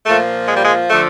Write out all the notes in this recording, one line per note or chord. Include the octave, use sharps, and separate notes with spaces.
A#2 F3 A3
G#3
G3
G#3
D3 F3 A3